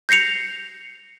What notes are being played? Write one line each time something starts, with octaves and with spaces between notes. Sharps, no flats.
G6 A#6 C7 C#7 F7